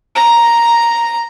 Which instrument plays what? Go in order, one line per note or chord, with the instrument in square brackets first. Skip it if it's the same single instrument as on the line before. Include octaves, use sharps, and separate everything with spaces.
[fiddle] A#5